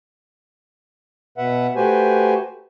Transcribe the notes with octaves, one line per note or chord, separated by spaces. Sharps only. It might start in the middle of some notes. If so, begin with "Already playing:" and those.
B2 B4 E5 F#5
A3 F#4 G4 B4 C5 G#5